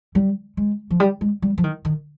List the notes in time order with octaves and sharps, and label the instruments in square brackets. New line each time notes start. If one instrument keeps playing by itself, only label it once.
[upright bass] G3
G#3
F3
G3
G#3
G3
F3
D#3
D#3